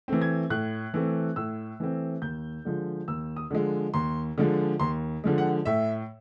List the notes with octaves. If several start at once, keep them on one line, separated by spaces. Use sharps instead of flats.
E3 A3 C4
G#6
A2 F#6
E3 A3 C4
A2 E6
E3 A3 C4
D#2 G6
D3 F3 G#3
D#2 E6
D#6
D3 F3 G#3
D#2 C6
D3 F3 G#3
D#2 C6
D3 F3 G#3
F#5
A2 E5